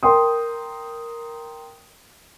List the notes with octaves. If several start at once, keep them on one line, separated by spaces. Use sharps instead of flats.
A#4 G5 C6 D#6